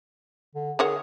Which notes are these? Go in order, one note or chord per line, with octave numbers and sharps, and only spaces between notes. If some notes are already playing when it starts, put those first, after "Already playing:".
D3
D#3 G#4 C#5 F#5